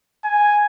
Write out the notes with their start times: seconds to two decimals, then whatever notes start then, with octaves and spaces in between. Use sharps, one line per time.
0.25 G#5